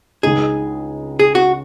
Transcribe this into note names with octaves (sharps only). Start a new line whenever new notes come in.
C#2 C#3 G#3 D#4 G#4
G#4
F#4